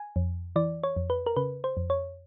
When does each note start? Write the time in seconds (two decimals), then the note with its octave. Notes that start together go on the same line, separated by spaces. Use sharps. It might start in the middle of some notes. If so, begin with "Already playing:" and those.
Already playing: G#5
0.16 F2
0.56 E3 D5
0.83 C#5
0.96 F2
1.10 B4
1.26 A#4
1.36 C#3 B4
1.64 C5
1.77 F2
1.90 C#5